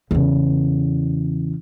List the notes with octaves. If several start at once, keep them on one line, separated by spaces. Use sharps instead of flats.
E2 C#3